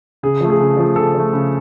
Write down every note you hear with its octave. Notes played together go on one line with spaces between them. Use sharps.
C#3 G#4
F3 A3
G#4
C#3
F3 A3
C#3 A4
F3 A3
C#3